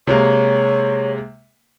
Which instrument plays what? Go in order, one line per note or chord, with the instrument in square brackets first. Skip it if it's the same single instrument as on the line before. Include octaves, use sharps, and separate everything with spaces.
[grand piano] C3 G#3 A#3 [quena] C#5